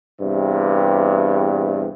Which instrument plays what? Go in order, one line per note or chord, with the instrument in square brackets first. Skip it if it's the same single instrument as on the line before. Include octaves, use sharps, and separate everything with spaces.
[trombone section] E2 G2 C3